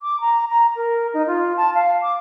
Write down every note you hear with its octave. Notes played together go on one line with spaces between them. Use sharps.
D6
A#5
A#5
A#4
D#4
F4
A5
F5
D6